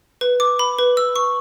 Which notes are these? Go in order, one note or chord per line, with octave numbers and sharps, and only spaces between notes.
B4
D6
B5
B4
E6
C#6